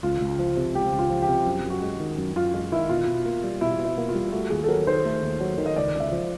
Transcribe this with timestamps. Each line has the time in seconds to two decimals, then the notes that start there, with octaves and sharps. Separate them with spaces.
0.03 C#2 F4
0.21 C#2
0.39 F3
0.57 C3
0.74 C#2 G4
0.92 C#2
0.99 F4
1.10 F3
1.22 G4
1.28 C3
1.46 F#2
1.64 F#2
1.70 F#4
1.82 G#3
2.00 D#3
2.18 F#2
2.36 F#2 F4
2.54 G#3 F4
2.72 D#3 E4
2.89 B2 F4
3.07 B2
3.26 A#3
3.44 G3
3.61 B2 E4
3.79 B2
3.85 E4
3.98 A#3
4.09 F4
4.14 G3
4.32 A3 F#4
4.50 D#2 G#4
4.64 A4
4.68 F#3 A#4
4.87 D#3 C5
5.05 A3
5.23 D#2
5.40 F#3
5.58 D#3
5.66 D#5
5.76 C#2 D5
5.94 C#2
6.00 E5
6.12 F3